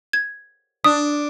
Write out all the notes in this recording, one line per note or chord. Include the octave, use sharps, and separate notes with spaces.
G#6
D4 D#6